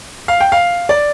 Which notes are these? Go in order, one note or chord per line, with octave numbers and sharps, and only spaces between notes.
F5
G5
F5
D5